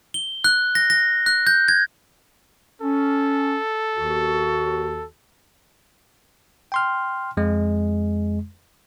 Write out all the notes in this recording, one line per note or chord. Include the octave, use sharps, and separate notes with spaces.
G7
F#6
A#6
A#6
F#6
G6
G#6
C#4 A4
D#2 D#3 F#4
G5 C6 F6
F2 G#3